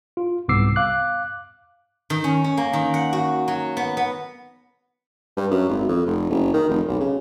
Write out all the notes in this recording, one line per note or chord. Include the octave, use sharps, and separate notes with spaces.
F4
C2 G#2 B3 D6 E6 C7
F5 D6 F#6
D#3
C#4
C#4
A#3
D#3
F#5
F#4
F#3
B3
B3
G2
F#2
G#1
F2
F1
F#1
D#3
F1
B1
C#3